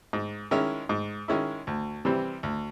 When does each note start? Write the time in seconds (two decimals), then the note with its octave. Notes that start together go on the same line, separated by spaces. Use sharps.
0.13 G#2
0.51 D#3 G#3 C#4 E4
0.89 G#2
1.28 D#3 G#3 C#4 E4
1.67 D2
2.05 C3 E3 G3 C4
2.43 D2